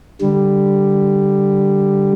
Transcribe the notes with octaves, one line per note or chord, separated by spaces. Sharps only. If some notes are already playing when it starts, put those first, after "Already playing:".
D3 G3